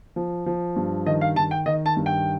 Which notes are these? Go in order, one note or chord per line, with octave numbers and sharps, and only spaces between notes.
F3
F3
G2
D#3 D#5
F5
D#3 A5
G5
D#3 D#5
A5
G2
G5